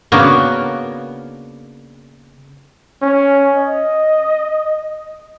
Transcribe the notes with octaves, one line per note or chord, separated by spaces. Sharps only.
C#3 A#3 B3 D4 F#4 A#4
C#4
D#5